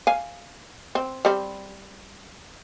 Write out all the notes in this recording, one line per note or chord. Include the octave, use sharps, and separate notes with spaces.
F5 G#5
C4
G3 C4